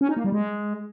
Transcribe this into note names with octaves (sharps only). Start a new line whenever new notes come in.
C#4
D#4
A#3
G3
G#3